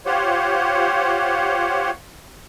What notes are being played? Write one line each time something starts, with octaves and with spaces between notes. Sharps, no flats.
F4 G4 C5 C#5 F#5